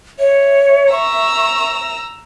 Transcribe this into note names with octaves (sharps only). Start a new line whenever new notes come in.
C#5 E5
A#5 C#6 E6